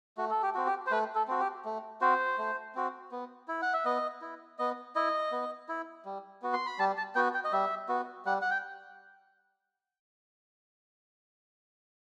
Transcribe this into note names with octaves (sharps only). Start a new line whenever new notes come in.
A3 F#4
A4
G4
C4 F#4
G4
C5
A3 B4
A4
C4 F#4
G4
A3
C4 F#4 C5
A3
C4 F#4
B3
E4
F#5
E5
B3 D#5
E4
B3 D#5
E4 D#5
B3
E4
G3
B3 F#4
C6
B5
G3 A5
A5
B3 F#4 G5
G5
D#5
G3 E5
B3 F#4
G3 F#5
F#5
G5